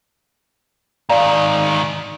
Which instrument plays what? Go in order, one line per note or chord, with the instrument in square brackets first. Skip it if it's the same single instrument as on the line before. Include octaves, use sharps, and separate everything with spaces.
[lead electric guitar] G#2 D#3 [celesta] D5 F5 A#5